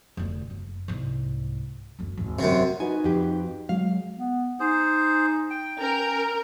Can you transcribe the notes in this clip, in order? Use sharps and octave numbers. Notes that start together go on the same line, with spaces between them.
F1 D2
F#1
C2 G#2
F#1 D2
G#1 D#2
F#2 C3 A3
D#4 F#4 B4 G#5
F2 G4
F#3 G#3 F5
B3
D#4 G#4 C5
G5
C#4 A#4